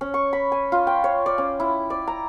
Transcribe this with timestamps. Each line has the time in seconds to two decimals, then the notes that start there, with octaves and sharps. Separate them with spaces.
0.01 C#4
0.14 C#6
0.33 B5
0.52 G#5
0.72 F4
0.87 G5
1.04 C#5
1.26 D5
1.38 C#4
1.60 E4
1.90 D5
2.07 A#5